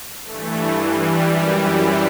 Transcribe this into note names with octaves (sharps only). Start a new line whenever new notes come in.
G2 E3 A3
G3
F#2 E3